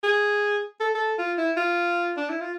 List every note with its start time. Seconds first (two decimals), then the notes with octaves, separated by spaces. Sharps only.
0.03 G#4
0.80 A4
0.95 A4
1.18 F4
1.38 E4
1.57 F4
2.17 D4
2.29 E4
2.40 F4